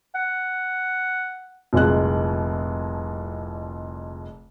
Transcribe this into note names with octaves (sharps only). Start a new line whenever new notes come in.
F#5
F1 C2 A#2 G#3 F#6